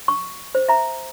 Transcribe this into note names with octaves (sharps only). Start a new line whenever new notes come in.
C#6
C5
E5 A#5